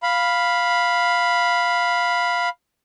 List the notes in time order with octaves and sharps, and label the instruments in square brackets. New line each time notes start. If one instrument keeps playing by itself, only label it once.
[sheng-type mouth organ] F5 B5